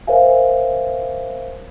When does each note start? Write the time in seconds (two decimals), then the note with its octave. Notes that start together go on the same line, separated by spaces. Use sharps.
0.07 A#4 C5 C#5 E5 F5 G#5